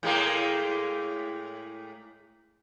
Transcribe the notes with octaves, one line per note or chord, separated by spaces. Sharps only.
A2 G#3 A#3